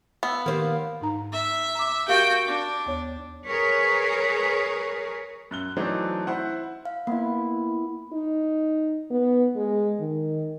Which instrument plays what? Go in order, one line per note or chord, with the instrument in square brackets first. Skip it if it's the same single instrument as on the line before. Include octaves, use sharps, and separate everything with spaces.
[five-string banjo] B3 [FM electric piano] F5 E6
[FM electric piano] D#3 G4 [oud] A#3 C5
[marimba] G#2 D#4 A#5
[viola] E5
[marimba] A#5 D6
[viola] F#4 G5 [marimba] G4 A#4 F5
[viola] D4
[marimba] D#2 B3 C#5
[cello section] G#4 A#4 B4 C#5
[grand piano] F#2 F#6 G7
E3 F#3 A3 C4 D4 D#4
E4 C5 F#5
[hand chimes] F5
[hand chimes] A#3 [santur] B3 E4
[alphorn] D#4
B3
G#3
D#3